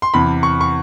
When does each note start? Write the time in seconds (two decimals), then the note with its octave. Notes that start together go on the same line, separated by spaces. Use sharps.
0.02 C6
0.14 E2 C3 E3 B5
0.43 C#6
0.61 C#6